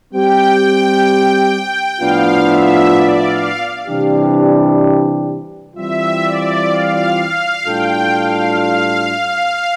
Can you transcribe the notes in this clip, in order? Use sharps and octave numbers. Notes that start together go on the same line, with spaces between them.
G3 C4 G4 G5
A2 F3 B3 D4 F4 F5
E5
D5
F5
C3 E3 G3 D4 G4
E3 G3 C4 F4 E5
D5
F5
F5
A2 G3 D4 F4 A4 G5
F5
F5